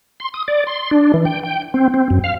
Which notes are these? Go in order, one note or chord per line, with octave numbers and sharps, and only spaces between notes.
C6
D#6
D5
C6
D4
E3
G5
G5
C4
C4
F#2
F5